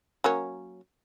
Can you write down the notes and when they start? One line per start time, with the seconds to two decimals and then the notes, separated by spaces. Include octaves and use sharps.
0.24 F#3 A#3 C#4